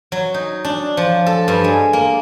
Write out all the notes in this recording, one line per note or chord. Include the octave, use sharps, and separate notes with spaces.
F#3
D#4
D4
F3
A4
G2
G#3
A#3